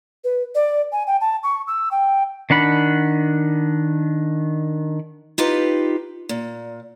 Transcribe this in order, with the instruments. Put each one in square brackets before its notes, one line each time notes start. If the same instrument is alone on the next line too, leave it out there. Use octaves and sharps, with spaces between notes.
[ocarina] B4
D5
G#5
G5
A5
C#6
E6
G5
[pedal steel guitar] D#3 D4 F#5 B5
[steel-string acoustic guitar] D#4 F4 G4 B4
A#2